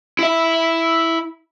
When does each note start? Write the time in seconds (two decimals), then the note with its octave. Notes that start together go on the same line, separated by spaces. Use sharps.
0.19 E4 E5